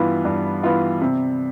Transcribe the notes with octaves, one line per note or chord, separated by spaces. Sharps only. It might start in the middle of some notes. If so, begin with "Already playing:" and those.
Already playing: G2 E3 B3 F4
G2
E3 B3 F4
C3